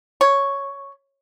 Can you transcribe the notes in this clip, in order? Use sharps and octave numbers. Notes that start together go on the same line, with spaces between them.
C#5